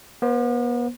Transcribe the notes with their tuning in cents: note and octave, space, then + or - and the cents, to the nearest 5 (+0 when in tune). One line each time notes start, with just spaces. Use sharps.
B3 -40 C5 +0